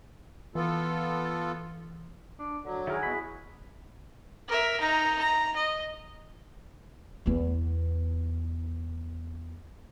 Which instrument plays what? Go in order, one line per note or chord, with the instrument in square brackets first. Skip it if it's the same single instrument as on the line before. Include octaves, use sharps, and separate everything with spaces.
[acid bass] E3 [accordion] B3 F4 A4
[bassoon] D4
[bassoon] D3 [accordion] F#3
[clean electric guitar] D#3 A#4 [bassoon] E4 [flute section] F#4 G#4
[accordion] B2 [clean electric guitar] B5
[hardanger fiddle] A#4 E5
D#4 A#5
A#5
D#5
[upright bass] E2 B3